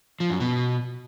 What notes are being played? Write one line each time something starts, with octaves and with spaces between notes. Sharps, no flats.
F3
F#2
B2